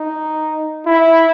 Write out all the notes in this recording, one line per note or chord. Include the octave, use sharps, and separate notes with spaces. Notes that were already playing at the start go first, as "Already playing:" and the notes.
Already playing: D#4
E4